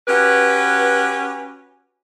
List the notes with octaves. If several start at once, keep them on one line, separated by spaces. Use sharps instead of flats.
C#4 F#4 G4 B4